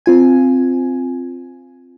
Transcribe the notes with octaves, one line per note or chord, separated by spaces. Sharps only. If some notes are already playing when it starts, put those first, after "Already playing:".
C4 F4 G#5